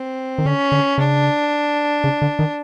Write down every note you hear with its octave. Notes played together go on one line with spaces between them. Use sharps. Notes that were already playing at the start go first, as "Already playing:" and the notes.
Already playing: C4
D#3
D3 C#4
D3
C#3 D4
C#3
D3
D#3